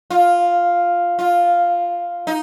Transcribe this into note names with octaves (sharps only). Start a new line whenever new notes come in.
F4
F4
D#4